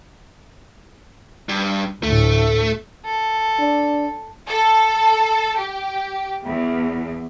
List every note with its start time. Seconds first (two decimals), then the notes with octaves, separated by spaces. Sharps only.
1.49 G2
2.03 D2 A2 A3
3.05 A4
3.60 D4
4.48 A4
5.57 G4
6.44 E2